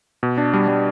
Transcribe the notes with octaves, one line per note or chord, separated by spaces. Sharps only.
B2
D4
G3
G3